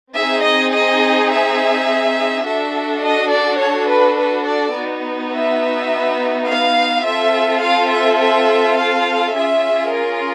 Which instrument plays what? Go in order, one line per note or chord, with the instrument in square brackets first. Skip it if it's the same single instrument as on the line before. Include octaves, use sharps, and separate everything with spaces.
[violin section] C4 D#4 G#4 E5
D#5
D#5
E5
D4 F#4 A4 E5
D#5
D5
C#5
B4
B4
D5
B3 D#4 F#4
E5
F5
C4 F4 A4 E5
F5
E5
E5
F5
C#4 F4 G#4 E5
A#4